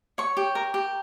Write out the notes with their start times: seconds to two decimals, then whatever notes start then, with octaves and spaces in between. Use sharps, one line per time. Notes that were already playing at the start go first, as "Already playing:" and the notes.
0.18 C#5 C#6
0.37 G4
0.55 A#4
0.74 G4